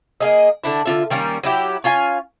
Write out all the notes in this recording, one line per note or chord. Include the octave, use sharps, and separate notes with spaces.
A#3 G#4 D#5
D3 D4 E4
D3 F4 E5
D#3 G3 A#3 C#4
F#3 E4 G4
C#4 F4 F5 G#5